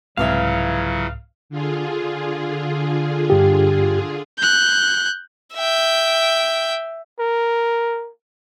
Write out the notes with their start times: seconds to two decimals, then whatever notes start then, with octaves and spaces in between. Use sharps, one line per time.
0.17 C2 F2 G#2 C#3 E3 F#3 E5 F5
1.50 D3 F4 G#4
3.30 G2 G4
4.38 F#6 G6
5.55 E5 G5
7.20 A#4